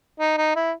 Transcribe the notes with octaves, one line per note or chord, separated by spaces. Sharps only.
D#4
D#4
E4